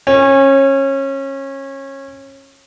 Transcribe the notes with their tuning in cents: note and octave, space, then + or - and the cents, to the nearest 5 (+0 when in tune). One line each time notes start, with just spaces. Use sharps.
C#4 -25